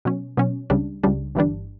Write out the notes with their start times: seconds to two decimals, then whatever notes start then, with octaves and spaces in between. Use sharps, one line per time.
0.05 B2 F#3 C#4
0.37 B2 F#3 C#4
0.70 C#2 C#3 G3 D4
1.03 C#2 C#3 G3 D4
1.35 G1 G2 E3 G3 D4